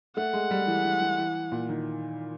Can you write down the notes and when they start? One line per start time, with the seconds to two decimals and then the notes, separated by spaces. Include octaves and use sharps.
0.17 A3 F#5
0.33 G#3
0.51 G3
0.67 E3
0.84 E3
1.01 E3
1.18 E3
1.52 A#2
1.69 D#3